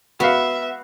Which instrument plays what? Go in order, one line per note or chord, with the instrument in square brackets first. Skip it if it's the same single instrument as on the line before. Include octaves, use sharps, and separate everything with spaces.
[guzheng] B3 [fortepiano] F#4 B4 F5 [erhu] E5